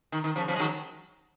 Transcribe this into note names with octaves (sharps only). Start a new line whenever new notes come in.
D#3
D#3
C#3 F3
C#3 F3
G#3
D#3 F#3